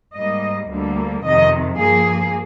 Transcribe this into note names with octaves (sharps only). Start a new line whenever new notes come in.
G#2 G3 A#3 D#5
D2 D3 G3 A#3
F2 C3 D#3 D#5
G2 F3 A#3 G#4